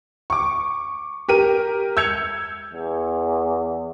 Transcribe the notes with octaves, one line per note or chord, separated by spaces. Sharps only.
C#6 D6
G4 A#4 D#7
E6 G6 G#6 C#7 F7
E2